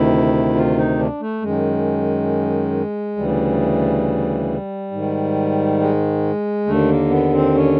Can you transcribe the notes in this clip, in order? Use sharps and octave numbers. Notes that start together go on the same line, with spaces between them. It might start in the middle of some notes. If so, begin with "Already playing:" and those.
Already playing: D2 C3 D#3 E4
F4
D#4
D4
A3
F#2 D#3 G#3
D2 C#3 E3 G3
G#2 D#3
G#3
D#2 D3 A3
A#3
B3
C4
C#4